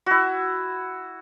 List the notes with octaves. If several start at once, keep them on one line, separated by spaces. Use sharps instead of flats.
E4 F#4